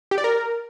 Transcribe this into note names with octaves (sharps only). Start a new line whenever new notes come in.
G4
D5
A#4